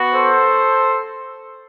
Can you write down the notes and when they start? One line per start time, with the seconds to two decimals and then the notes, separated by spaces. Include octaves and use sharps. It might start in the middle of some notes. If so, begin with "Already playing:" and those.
Already playing: B3 F#4
0.13 A4 C5